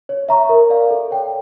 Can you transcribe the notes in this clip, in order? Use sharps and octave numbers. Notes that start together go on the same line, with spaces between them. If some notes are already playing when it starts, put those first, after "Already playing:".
C#5
E5 A#5 C#6
A#4
D5 F5
A4
C#5 G5